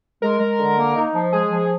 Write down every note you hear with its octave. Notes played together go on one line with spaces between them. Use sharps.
G#3 A#4
G#3
D3
A#3
D#4
F3
G#3 G#4
F3